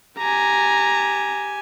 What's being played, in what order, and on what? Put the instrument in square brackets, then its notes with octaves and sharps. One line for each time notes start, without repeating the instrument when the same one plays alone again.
[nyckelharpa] G4 G#5 [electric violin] A#5